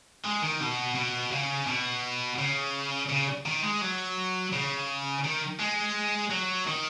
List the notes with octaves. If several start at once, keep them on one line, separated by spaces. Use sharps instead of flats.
G#3
D#3
B2
B2
C#3
B2
C#3
C#3
D#3
G#3
F#3
C#3
D#3
G#3
F#3
D#3